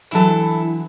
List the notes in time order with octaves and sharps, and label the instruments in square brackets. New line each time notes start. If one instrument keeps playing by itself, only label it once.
[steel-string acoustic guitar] D3 E3 F#3 [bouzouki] E4 A4